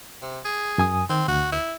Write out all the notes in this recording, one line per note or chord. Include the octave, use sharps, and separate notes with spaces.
C3
G#4
F#2 G#5 D#6
D#3 C4
D2 F#4
E4